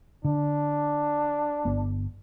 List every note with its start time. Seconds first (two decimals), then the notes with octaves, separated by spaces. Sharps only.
0.25 D3 D4
1.65 G1 B3